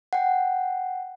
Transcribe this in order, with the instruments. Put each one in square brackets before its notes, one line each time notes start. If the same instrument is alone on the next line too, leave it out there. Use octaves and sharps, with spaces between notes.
[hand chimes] F#5 G5